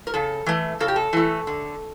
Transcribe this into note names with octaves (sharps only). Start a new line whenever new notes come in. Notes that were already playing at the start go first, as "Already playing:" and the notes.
A#4
C#3 A4
E3 A3
C#3 A4
G4
A4
E3 A3
D3